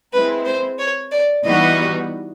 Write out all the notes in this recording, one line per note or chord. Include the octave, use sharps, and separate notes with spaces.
G#3 C4 E4 B4
C5
C#5
D5
E3 G3 B3 D#4 F#4 D#5